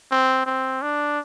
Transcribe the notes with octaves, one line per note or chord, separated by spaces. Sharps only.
C4
C4
D4